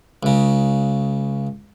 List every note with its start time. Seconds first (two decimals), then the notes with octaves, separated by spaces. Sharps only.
0.23 C#2 C#3